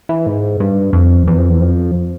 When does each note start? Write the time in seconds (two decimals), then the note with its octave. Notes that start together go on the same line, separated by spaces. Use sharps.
0.09 E3
0.26 G#2
0.60 G2
0.93 F2
1.27 E2
1.38 F2
1.49 E2
1.61 F2